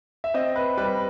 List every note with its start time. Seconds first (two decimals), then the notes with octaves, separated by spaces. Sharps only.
0.24 E5
0.34 C4 D#5
0.56 B4
0.77 G3 B4